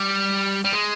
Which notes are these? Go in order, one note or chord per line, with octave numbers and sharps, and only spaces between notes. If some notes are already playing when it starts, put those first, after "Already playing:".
Already playing: G3
G3
G#3